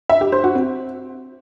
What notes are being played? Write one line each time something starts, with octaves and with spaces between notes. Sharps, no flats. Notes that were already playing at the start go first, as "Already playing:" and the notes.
E5
G4
C5
F#4
C4